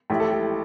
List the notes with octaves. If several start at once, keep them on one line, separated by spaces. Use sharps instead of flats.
A1 A2 A3 G4
A4
G4